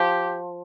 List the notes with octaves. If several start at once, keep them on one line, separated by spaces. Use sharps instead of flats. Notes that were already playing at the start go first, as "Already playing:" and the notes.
Already playing: F3 G4